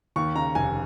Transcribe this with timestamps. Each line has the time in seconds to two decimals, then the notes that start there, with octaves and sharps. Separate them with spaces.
0.16 D#2 C#6
0.35 C#3 A#5
0.55 F1 G#5